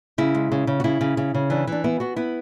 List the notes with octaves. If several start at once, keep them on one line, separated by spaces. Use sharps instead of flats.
C#3 E4
G#3
C#3
C#3
F#4
C#3 E4
C#3
C#3
C#3
E3 D4
E3 D4
B3 E4
B3 F#4
B3 E4